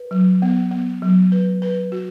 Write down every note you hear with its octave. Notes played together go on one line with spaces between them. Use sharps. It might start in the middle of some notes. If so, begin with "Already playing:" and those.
Already playing: B4
F#3
B3
B3
F#3
B4
B4
F#4